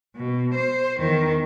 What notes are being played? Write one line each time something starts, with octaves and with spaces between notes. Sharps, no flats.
B2
C5
E2 D#3